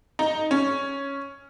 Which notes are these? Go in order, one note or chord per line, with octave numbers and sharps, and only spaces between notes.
D#4
C#4